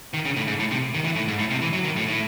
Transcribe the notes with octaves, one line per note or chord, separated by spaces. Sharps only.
D#3
C#3
A2
G#2
A2
C3
D#3
E3
A2
G#2
A2
C3
E3
F#3
D#3
A2
A2